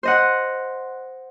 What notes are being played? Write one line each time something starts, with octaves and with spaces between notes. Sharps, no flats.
C5 D#5 F#5